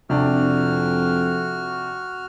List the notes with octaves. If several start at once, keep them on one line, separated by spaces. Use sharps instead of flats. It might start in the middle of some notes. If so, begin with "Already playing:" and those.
F2 C3 D4 F#4 F6